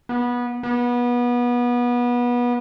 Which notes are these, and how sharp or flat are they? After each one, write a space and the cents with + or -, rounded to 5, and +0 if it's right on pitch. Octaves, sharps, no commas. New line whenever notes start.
B3 -20
B3 -25